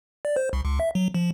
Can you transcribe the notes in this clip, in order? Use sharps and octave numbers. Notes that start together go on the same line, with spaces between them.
D5
C5
C2
C#2
E5
F#3
F3